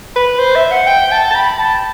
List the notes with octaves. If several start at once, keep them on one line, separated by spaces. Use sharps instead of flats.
B4
C5
E5
F#5
G5
A5
A5
B5
A5